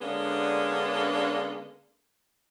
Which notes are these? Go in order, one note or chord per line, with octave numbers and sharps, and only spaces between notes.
D3 G#3 A#3 B3 C#4 D4